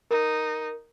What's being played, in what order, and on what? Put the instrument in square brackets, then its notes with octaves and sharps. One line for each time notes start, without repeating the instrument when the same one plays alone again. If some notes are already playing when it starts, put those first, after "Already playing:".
[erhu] D#4 [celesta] A#4